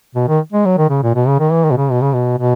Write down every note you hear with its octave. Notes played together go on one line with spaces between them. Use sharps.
B2
D#3
G#3
F#3
D#3
C#3
A#2
B2
C#3
D#3
E3
D#3
B2
C#3
B2
C#3
B2
B2